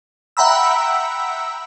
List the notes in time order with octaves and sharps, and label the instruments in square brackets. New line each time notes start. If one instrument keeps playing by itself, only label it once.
[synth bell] E5 F#5 G5 A#5 B5 E6